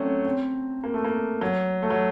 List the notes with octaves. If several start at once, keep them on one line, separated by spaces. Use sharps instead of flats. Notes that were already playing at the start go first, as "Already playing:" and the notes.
Already playing: F#3 A3 C4 C#4
C4
A#3
A3
A#3
F#3
A3
F#3